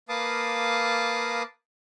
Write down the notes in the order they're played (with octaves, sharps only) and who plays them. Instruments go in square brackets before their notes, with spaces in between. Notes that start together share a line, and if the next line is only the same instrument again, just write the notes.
[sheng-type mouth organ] A#3 B4 F5 A5 D6 D#6